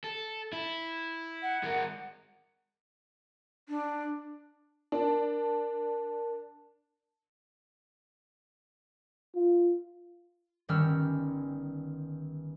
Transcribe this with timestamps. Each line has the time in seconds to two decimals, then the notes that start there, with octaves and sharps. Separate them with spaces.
0.04 A4
0.53 E4
1.43 F#5
1.63 G#3 A#4
3.69 D4
4.92 D4 A#4 A5
9.36 F4
10.69 G1 D#3 G3 C#4 E6 F6